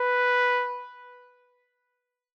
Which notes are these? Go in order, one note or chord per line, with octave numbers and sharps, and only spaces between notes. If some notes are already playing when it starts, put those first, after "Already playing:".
Already playing: B4